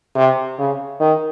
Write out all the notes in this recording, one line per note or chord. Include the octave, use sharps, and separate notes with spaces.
C3
C#3
D#3